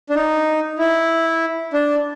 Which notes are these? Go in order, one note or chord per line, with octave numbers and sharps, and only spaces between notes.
D4
D#4
E4
D4